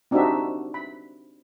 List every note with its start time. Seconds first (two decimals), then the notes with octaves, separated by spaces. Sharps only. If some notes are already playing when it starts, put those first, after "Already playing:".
0.11 C4 D4 D#4 F#4 G4 E5
0.74 B5